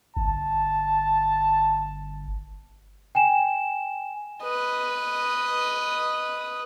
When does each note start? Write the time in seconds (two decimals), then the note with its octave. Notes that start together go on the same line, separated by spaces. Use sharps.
0.17 G1 A5
3.15 G5 G#5 E7
4.43 B4 D#5